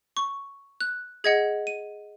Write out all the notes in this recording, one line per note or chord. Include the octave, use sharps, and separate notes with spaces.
C#6
F#6
G#4 D#5 F#5 G#6
D#7